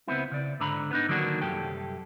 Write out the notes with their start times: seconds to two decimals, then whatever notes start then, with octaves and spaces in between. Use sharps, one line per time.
0.08 C#2 B3 C4 E4
0.32 C#3 D5
0.60 G#2 D3 A#5 B5
0.91 B3 D4 D#4
1.09 D3 D#3 F#3 A#3 D4 F#4
1.42 C2 F#2 G4 A4 G5